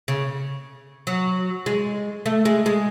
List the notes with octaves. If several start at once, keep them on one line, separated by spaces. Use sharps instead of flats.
C#3
F#3
G#3
A3
G#3
G#3